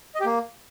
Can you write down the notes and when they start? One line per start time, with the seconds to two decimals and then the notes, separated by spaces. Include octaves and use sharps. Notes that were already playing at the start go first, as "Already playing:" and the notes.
0.15 D#5
0.20 G4
0.25 A#3